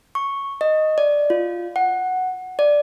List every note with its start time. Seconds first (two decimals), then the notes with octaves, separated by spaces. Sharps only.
0.15 C#6
0.61 D#5
0.98 D5
1.30 F4
1.76 F#5
2.59 D5